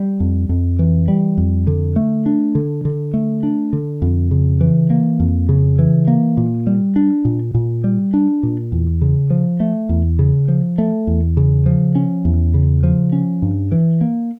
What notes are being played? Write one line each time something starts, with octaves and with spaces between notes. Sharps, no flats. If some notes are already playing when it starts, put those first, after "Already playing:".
Already playing: G3
F2
F2
E3
G3
F2
D3
A3
D4
D3
D3
A3
D4
D3
F2
C#3
E3
A#3
F2
C#3
E3
A#3
A#2
G3
D4
A#2
A#2
G3
D4
A#2
E2
C#3
F3
A3
E2
C#3
F3
A3
E2
C#3
F3
C#4
E2
C#3
F3
C#4
G2
E3
A#3